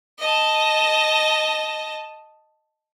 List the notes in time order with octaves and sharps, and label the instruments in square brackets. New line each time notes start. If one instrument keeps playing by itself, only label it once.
[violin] D#5 A5